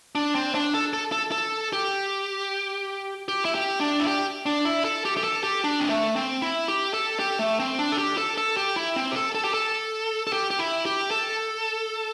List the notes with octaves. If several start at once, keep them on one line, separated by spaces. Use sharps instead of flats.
D4
C4
D4
A4
A4
A4
A4
G4
G4
E4
G4
D4
E4
G4
D4
E4
A4
G4
G4
A4
G4
D4
C4
A3
C4
E4
G4
A4
G4
A3
C4
D4
A4
G4
A4
A4
G4
E4
C4
G4
A4
A4
G4
A4
A4
G4
G4
E4
G4
A4